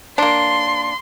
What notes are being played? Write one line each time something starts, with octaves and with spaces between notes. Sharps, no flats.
A#3 D4 C6